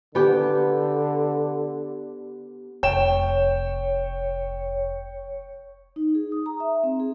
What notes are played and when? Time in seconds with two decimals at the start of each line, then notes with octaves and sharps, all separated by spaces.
0.15 D3 B3 G4
2.83 F1 C#5 G5 E7
5.96 D#4
6.15 G#4
6.32 D#6
6.46 A#5
6.60 E5
6.84 C4
7.00 G#4